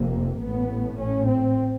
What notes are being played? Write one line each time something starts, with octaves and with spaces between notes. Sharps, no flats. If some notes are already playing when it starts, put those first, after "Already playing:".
Already playing: F1 F2 C3 A#3
A1 A2 B3
C#4
C4